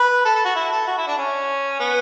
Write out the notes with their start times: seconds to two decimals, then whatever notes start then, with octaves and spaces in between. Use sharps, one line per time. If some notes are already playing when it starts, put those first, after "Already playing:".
Already playing: B4
0.25 A4
0.35 A4
0.45 F#4
0.55 E4
0.72 A4
0.87 F#4
0.98 E4
1.07 D4
1.18 C#4
1.80 B3